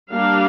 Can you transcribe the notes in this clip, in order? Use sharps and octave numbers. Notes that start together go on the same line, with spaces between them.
G3 A#3 D4 F5